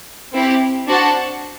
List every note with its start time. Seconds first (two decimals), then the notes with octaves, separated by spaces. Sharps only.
0.33 C4 E4 G4
0.87 D4 F#4 C5 F#5 A5